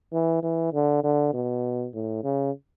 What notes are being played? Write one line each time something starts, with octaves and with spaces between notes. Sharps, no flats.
E3
E3
D3
D3
B2
A2
C#3